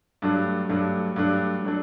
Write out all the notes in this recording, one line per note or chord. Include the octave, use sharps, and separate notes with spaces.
G2 F#3 A3 D4
G2 F#3 A3 D4
G2 F#3 A3 D4
F#3 A3 D4